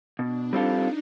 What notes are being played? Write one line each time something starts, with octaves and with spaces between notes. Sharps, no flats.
B2 D4
G3 C4 D#4 F4 A4